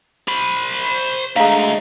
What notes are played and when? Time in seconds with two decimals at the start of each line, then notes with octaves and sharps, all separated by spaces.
0.28 C5 B5
1.36 G#3 A3 D4 F5 A#5